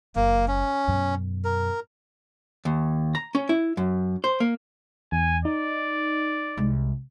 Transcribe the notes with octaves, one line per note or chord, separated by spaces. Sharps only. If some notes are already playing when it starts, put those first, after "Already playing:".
F#1 A#3
C#4
F#2 B2
A#4
D#2
A#5
C#4
E4
F#2
C5
A#3
E2 G#5
D#4 D5
C2 G#3